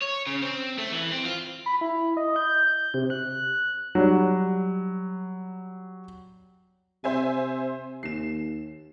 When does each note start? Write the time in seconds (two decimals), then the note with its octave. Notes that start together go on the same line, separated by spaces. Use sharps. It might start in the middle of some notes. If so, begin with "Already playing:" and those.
0.02 C#5
0.27 C#3
0.42 C4
0.78 A3
0.92 E3
1.12 C4
1.25 F4
1.66 B5
1.81 E4
2.17 D#5
2.36 G6
2.94 C3
3.10 F#6
3.95 F#3 G3
7.04 C3 C5 E5 G#5
8.03 D#2 C7 E7